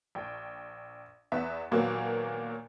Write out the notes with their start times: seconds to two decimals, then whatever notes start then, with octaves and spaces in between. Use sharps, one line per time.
0.15 A#1 G5
1.32 E2 B3 E5
1.71 D#2 A#2 F#3 A#3 B3